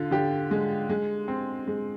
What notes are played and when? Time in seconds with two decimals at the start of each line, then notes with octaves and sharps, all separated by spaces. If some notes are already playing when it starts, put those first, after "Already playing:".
Already playing: D3 F4
0.11 D3 G4
0.51 G#3
0.89 G#3
1.28 C4
1.68 G#3